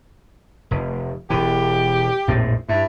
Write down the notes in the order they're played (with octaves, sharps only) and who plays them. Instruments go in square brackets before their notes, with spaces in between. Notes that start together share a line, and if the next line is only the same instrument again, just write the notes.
[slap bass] F1
[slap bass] E1 E3 [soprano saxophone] G4
[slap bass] A#1 F2 A2
[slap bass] G2 [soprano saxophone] E4